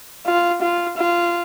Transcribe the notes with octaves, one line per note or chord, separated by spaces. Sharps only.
F4
F4
F4